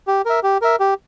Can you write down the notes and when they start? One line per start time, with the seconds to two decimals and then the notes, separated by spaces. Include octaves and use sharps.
0.07 G4
0.26 A#4 E5
0.43 G4
0.62 A#4 E5
0.80 G4